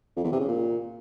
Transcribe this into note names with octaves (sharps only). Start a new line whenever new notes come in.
F2
E2
C3
C#3
A#2